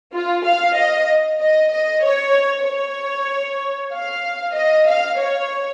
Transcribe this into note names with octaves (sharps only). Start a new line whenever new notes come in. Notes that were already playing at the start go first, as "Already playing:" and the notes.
F4
F5
D#5
D#5
D#5
C#5
C#5
F5
D#5
F5
C#5